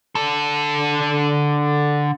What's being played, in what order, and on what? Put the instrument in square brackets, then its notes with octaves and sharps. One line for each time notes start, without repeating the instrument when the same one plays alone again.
[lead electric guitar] D3 A4